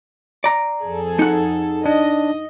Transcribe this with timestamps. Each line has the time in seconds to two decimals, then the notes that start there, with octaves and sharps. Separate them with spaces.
0.44 D5 A#5
0.83 F2 G#4 A4
1.19 D#4 F#5
1.86 D4 D#5